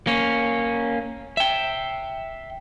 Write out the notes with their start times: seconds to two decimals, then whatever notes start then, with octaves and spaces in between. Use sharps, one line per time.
0.07 A#3 C#4
1.37 E5 G5